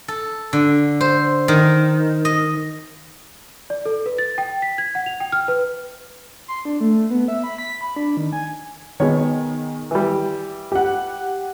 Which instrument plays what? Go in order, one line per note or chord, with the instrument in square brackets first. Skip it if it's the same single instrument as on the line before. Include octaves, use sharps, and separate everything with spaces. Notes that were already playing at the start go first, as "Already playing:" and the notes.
[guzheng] A4
D3
C5
D#3
D#5
[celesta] D5
A4
B4
A6
G5
B6
G#6
F#5
F7
G5
F6
B4
[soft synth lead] C6
D4
A3
B3
E5
B5
B6
B5
D4
D#3
G#5
[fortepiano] B2 C#5 [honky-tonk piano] D#3 G#4
[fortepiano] E3 G3
[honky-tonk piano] G4 F#5